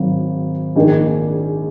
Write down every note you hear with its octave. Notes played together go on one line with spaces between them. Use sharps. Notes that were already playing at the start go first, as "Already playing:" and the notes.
Already playing: G#1 G#2 F#3
A#1 G#2 D#3